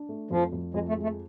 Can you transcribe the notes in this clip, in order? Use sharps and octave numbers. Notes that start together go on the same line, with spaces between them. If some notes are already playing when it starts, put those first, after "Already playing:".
Already playing: D4
A3
F2 F3
F2
F2 G#3
A3
G#3
A3